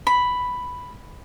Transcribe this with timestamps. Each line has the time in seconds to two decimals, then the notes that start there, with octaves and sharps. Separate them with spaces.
0.07 B5